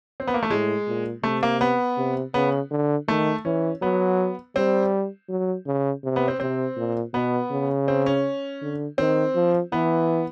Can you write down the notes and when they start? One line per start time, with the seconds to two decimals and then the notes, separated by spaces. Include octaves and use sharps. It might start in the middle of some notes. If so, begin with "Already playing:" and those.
0.20 C4
0.27 B3
0.34 A#3
0.43 A3
0.50 A2 G#3
0.87 A#2
1.23 C3 A3
1.43 A#3
1.61 B3
1.97 C3
2.34 C#3 B3
2.71 D3
3.08 D#3 A3
3.45 E3 C#4
3.82 F#3 B3
4.56 G3 C4
5.29 F#3
5.66 C#3
6.04 C3
6.16 B3
6.28 C4
6.40 C3 C4
6.77 A#2
7.14 B2 B3
7.51 C#3
7.88 C4
8.06 C#4
8.61 D3
8.98 D#3 C4
9.35 F3
9.72 E3 B3